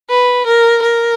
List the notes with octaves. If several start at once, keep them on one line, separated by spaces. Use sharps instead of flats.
B4
A#4
A#4